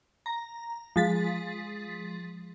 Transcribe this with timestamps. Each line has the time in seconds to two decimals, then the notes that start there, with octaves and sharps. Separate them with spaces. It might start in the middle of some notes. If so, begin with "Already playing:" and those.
0.26 A#5
0.96 F3 G#3 A6 B6